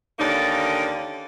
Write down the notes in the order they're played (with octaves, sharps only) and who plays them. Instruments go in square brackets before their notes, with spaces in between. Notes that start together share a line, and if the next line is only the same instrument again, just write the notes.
[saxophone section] D#2 D3 A#3 C#4 D#4 D5